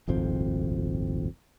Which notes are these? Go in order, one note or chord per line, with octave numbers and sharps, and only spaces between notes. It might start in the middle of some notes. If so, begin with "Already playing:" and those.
D#1 G#1 F2 C4